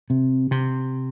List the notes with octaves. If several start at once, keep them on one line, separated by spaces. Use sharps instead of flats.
C3
C3